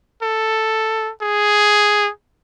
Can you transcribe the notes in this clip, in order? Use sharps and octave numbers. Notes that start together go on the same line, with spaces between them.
A4
G#4